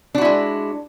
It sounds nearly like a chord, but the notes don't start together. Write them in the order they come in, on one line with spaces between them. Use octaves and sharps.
D4 F#4 E4 G#3